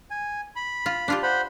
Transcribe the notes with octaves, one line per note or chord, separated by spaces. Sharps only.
G#5
B5
F4
D4 F4 G4
C5 F#5 B5